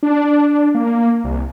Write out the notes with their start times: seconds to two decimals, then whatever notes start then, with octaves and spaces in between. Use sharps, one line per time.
0.03 D4
0.75 A#3
1.24 C2